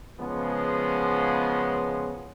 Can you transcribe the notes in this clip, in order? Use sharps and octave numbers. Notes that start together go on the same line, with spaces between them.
C#3 F3 G#3 B3